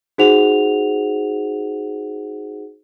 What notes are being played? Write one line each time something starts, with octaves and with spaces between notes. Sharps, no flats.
D#4 F#4 G#4 C5 F#5 F7